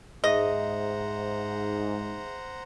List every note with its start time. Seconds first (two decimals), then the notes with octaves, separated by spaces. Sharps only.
0.24 G#2 G#4 C5 D#5 E5 F#5 A#5